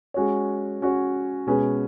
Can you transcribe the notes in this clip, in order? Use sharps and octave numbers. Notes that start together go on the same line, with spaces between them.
G#3 C#4 F#4 C#5
G#3 C#4 F#4 C#5
B2 G#3 C#4 G#4 B4